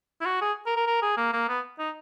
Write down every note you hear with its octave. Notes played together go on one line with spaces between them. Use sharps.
E4
F#4
G#4
A#4
A#4
A#4
G#4
A#3
A#3
B3
D#4